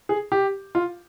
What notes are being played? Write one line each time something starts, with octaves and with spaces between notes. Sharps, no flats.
G#4
G4
F4